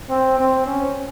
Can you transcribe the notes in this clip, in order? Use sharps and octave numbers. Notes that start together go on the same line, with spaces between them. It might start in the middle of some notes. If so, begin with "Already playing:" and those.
C4
C4
C#4